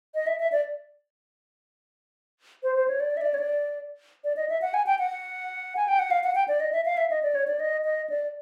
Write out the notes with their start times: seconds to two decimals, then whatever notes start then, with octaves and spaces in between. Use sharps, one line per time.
0.15 D#5
0.27 E5
0.40 E5
0.52 D5
2.63 C5
2.75 C5
2.88 C#5
3.00 D5
3.17 E5
3.21 D5
3.34 C#5
3.38 D5
4.24 D5
4.37 D#5
4.49 E5
4.62 F#5
4.74 G#5
4.86 G5
4.99 F#5
5.77 G#5
5.88 G5
5.99 F#5
6.11 F5
6.24 F#5
6.35 G5
6.48 D5
6.60 D#5
6.73 E5
6.85 F5
6.97 E5
7.10 D#5
7.23 D5
7.35 C#5
7.47 D5
7.60 D#5
7.84 D#5
8.10 D5